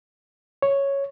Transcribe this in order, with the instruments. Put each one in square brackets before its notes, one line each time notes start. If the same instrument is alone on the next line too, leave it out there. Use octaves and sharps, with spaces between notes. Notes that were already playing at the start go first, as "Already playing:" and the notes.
[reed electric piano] C#5